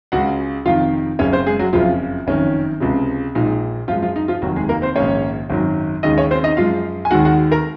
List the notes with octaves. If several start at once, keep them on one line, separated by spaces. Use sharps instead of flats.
C#2 C#3 G#3 F#4 F#5
F1 F2 D#3 F4 F5
F#1 F#2 C#3 C#4 C#5
C4 C5
G#3 G#4
F#3 F#4
F#1 F2 C#3 F3 F4
F#1 F2 D#3 C#4
C#2 C3 F3 G#3
A#1 A#2 G#3 D#4
F#2 F3 G#3 F4
F3 F4
D#4
F3 F4
F1 D#2 D#3 F#3 F#4
G#3 G#4
A#3 A#4
C4 C5
A#1 G#2 D#3 A#3 C#4 C#5
G#1 F#2 D#3 F#3
D#2 C#3 G#3 D#4 D#5
C#4 C#5
C4 C5
D#4 D#5
F#2 F3 G#3 F4 F5
G#5
D#2 D#3 G#3 F#4 F#5
F#4 F#5
A#4 A#5